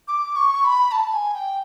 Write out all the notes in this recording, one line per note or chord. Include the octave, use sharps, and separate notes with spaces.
D6
C#6
B5
A5
G#5
G5